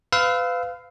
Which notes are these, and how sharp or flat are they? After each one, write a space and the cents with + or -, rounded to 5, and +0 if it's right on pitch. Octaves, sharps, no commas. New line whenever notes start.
B4 +35 F5 +0 E6 -10